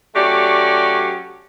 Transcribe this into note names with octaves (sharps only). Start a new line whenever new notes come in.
F#3 A3 C#4 G4 D5